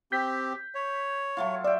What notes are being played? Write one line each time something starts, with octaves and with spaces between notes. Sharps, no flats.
C4 G4 G6 B6
C#5
F#3 A3 F4
D5 E5 G5